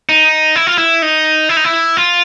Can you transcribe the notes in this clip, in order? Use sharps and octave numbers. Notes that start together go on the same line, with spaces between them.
D#4
E4
F4
E4
D#4
E4
D#4
E4
F4